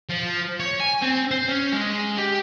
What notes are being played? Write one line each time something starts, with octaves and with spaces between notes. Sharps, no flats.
F3
C#5
G#5
C4
C5
C#4
G#3
G4